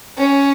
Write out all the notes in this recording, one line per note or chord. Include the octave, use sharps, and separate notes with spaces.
C#4